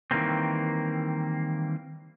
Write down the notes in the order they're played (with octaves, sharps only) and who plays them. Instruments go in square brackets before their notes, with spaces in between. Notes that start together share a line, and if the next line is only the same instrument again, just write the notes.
[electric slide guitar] D#3 E3 G3 A#3 C4